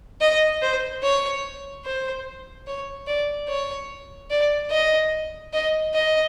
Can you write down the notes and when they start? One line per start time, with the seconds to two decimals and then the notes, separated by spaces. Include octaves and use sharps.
0.21 D#5
0.62 C5
1.03 C#5
1.85 C5
2.67 C#5
3.07 D5
3.48 C#5
4.31 D5
4.71 D#5
5.53 D#5
5.94 D#5